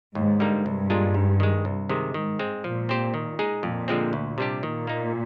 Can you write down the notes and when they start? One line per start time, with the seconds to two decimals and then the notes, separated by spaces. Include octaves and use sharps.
0.15 D#2 G#2
0.40 D3 G3 A#3 D#4
0.65 C2 G2
0.90 A#2 G#3 D4 F4
1.14 G#2
1.40 D#3 G#3
1.65 C2
1.89 C3 D#3 G#3
2.14 G#2 D#3
2.39 G#3 C4
2.64 A#2 F3
2.89 C4 G4 C5
3.14 D#3
3.39 G#3 D#4 G#4
3.63 F2 A#2
3.88 D3 F3 G#3 C4
4.13 D2
4.38 C3 G3 D4 G4
4.63 A#2 D#3
4.87 A#3 D#4